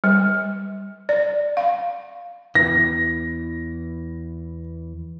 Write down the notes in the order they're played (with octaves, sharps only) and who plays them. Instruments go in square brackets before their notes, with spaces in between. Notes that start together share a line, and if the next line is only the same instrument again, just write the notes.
[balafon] G3
D5
F5
[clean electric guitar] E2 E3 [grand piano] A#6